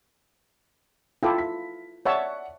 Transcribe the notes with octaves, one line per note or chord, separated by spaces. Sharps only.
E4 F4 A4 G5 D6
B6
C#5 D5 E5 F#5 A5 C#6